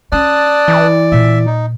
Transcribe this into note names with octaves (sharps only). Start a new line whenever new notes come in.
C#4 D5 A5 D#6 F#6
E3
A#2 E5
D#4